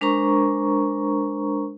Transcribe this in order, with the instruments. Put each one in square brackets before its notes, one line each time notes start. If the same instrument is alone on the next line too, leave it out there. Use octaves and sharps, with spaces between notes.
[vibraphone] G#3 D4 A#4 C5 A#5 C#6